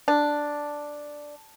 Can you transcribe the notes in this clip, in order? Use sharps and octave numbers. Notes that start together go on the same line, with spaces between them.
D4